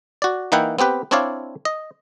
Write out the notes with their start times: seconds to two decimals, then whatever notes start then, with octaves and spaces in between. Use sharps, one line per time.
0.22 F#4 D5
0.52 E3 A#3 D#4 E4 F#5 G5
0.79 B3 C4 G4 B4
1.11 C4 D4 E4 C#5 D5 F5
1.65 D#5